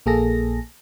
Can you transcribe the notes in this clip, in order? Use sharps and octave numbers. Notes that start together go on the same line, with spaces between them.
A#1 A#3 G#4 A4 A#6